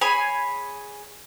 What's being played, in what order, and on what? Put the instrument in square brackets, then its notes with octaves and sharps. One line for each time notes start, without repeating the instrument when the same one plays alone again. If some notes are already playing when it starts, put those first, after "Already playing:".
[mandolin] G#4 C#5 G#5 B5